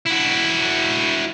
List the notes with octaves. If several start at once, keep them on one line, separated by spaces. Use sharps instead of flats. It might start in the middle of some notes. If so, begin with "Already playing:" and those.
E4 F#4